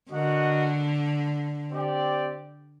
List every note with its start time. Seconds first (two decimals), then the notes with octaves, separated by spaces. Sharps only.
0.11 D3 F#4 A#4 D#5 F#5
1.71 C4 G4 D5 G5